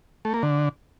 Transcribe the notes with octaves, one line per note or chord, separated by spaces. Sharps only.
A3
A#3
D3